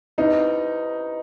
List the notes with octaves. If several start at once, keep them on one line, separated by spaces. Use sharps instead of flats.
C4 D#4 E4 G4 B4